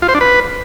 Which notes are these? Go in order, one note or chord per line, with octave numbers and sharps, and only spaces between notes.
F4
C5
D4
B4